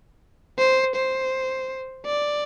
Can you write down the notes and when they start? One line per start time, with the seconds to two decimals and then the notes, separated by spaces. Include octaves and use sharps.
0.58 C5
0.96 C5
2.06 D5